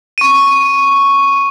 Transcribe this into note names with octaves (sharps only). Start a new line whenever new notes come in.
C#6 D#7